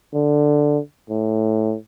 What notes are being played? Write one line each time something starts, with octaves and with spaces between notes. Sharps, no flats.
D3
A2